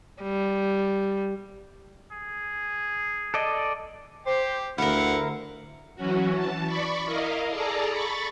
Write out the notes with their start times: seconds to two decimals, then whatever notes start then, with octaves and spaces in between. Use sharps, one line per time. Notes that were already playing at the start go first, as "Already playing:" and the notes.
0.23 G3
2.11 G#4
3.34 A4 D5 D#5
4.27 G4 C5
4.78 D2 G2 D3 E4 A#4 F5 F#5
5.96 E3 F#3 C#4 F#4
6.31 E3 A5
6.66 D5 B5 C#6
7.05 E4 A#4 D#5 F5
7.50 G#4 A4 D5 A5 A#5
7.89 B5 C#6 A6